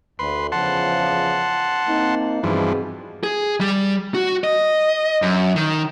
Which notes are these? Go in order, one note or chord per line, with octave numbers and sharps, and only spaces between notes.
D2 B4 C6
E2 C#3 F3 F#5 A5 C6
A#3 C4 D#4
G2 B2 E3 F3 C4 G#4
G#4
G3
F#4
D#5
F#2
D#3